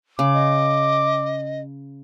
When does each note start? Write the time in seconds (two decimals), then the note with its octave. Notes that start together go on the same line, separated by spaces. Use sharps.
0.19 C#3 D6
0.34 D#5